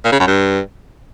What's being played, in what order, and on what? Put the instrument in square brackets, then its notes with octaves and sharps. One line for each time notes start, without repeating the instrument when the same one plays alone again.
[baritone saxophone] A#2
C#3
F#2
G2